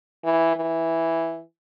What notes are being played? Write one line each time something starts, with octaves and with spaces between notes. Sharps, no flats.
E3
E3